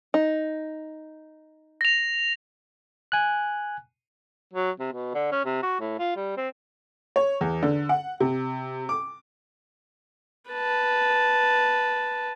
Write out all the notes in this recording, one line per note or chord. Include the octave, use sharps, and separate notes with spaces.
D#4
A#6 F7
G#5 F#6
F#3
C3
B2
D3
C#4
C3
F#4
A2
F4
G3
C4
C#5
E2
D3
F#5
C3
D6
B4 A5